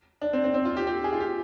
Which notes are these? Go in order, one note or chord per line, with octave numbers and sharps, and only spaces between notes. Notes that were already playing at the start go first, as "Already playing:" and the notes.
D4
C4
C4
C4
F4
G4
G4
G#4
F4
G4